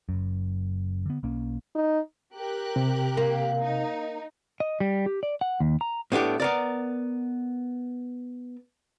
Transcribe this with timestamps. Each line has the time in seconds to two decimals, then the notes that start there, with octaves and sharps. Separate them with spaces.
0.09 F#1 F#2
1.06 D3 B3
1.23 B1 A#3 C#4
1.75 D#4
2.36 G4 A#4 F#6
2.76 C3
3.17 A#3
3.60 D#4
4.60 D#5
4.80 G3
5.06 G4
5.23 D5
5.41 F#5
5.60 D#2
5.81 A#5
6.12 A2 B3 D4 G4
6.40 B3 A#4 D5